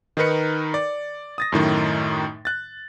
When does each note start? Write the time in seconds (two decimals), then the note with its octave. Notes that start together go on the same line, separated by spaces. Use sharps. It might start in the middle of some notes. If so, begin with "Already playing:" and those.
0.17 D#3 D#4 A#4 B4 C#7
0.74 D5
1.38 D#6 A6 A#6
1.52 F#2 A2 D#3 D#4
2.45 F#6 A6